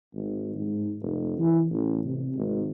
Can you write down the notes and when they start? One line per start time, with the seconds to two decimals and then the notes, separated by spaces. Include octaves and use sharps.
0.14 G#1
0.55 G#2
1.02 F1
1.39 E3
1.70 A1
2.04 C3
2.34 G#1